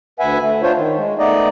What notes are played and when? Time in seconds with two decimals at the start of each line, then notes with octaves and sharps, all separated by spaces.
0.20 D2 B4 E5 F#5 G#5
0.42 A3
0.63 D4 F4 C5 C#5
0.77 D#3
0.97 G#3
1.19 A3 B3 D#4 D5 D#5